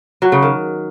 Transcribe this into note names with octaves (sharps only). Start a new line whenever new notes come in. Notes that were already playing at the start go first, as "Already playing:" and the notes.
F#3
C#3
D#3